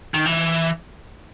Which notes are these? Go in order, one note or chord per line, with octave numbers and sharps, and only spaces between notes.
D#3
E3